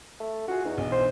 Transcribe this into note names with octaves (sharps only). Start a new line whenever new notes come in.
A3
F4 F#4 G#4
E2 D#4
B1 G2 E3
C5